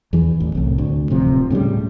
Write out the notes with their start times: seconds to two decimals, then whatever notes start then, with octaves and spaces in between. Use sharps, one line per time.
0.13 E2 E3
0.40 A1
0.55 C2 A2
0.78 D2
1.10 D1 C3 F3
1.50 A2 C#3 F3 G3